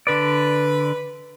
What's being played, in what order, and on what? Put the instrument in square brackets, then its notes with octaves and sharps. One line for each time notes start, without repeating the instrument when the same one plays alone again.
[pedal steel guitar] D3 D5 [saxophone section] B4